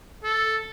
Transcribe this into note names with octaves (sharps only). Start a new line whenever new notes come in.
A4